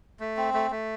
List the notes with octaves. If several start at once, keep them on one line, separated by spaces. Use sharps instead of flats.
A3
C4
A3
A3